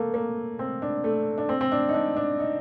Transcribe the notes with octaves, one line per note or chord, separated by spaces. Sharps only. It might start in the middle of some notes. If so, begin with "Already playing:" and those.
Already playing: A3 A#3
A#3
C4
D4
A3
D4
C4
C4
D4
D#4
D4
D4
D#4